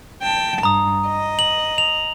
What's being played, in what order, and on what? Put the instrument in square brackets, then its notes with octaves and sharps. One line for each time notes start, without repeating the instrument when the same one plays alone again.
[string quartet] G5 A5
[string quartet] G2 [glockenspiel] A#5 D#6
[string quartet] D#5
[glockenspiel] F#7
F7